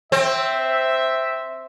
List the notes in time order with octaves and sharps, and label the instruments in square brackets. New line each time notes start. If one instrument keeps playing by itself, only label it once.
[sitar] C4 [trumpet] E5